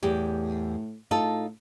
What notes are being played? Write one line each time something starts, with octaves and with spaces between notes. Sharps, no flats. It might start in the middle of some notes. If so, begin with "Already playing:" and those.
E2 A2 G4
A2 D#4 F4 A4